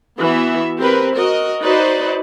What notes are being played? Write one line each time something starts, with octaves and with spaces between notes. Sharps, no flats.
E3 B3 F#4 E5
C4 G4 A#4 B4
F#4 A#4 D#5
D#4 F#4 B4 C5 D5 D#5